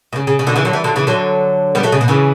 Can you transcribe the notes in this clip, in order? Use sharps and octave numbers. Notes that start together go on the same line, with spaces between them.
B2
C#3
C#3
C#3
B2 D3
C#3 E3
D3 F#3
E3 G3
D3 F#3
C#3 E3
D3 F#3
G3 B3
F#3 A3
C#3
B2
C#3 E3